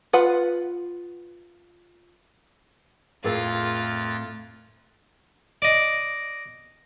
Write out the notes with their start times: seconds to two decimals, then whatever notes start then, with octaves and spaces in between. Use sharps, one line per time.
0.13 F4 B4 F#5
3.24 F2 A2 F4 G#4 A#4 C6 A6
5.62 D5 D#5